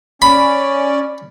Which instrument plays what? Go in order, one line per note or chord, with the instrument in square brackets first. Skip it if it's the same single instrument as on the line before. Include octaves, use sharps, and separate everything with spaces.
[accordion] C#4 D5 [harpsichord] B5